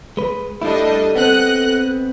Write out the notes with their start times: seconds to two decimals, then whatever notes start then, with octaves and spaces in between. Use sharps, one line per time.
0.17 G#3 B4
0.62 G3 A3 D4 E4 A4 D#5
1.16 B3 C4 D#5 F#5 F#6